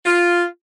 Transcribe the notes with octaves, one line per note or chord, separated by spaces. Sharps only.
F4